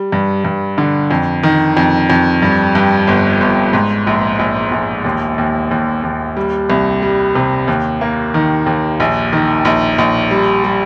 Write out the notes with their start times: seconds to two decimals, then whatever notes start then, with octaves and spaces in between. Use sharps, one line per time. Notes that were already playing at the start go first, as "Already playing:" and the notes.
Already playing: G3
0.12 G2
0.44 G2
0.78 D3
1.11 F2
1.43 D#3
1.77 F2
2.10 F2
2.42 G2
2.75 G2
3.07 G1
3.41 G1
3.73 G#2
4.07 A#1
4.39 A#1
4.72 A#1
5.05 D#2
5.38 D#2
5.71 D#2
6.03 D#2
6.37 G3
6.70 C2
7.02 G3
7.35 C3
7.68 D#2
8.01 A#3
8.34 D#3
8.66 D#2
9.00 A#1
9.33 D#3
9.65 A#1
9.98 A#1
10.31 G3
10.64 G3